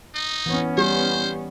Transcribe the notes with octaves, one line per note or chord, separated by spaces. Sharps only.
D#4
E3 B3 C#4
G3 G4 C5